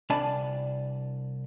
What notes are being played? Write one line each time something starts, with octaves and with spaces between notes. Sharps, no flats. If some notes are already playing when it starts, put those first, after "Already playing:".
C2 D4 D5 G#5 A5 B5